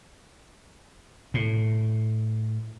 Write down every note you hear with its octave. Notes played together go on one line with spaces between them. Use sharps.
A2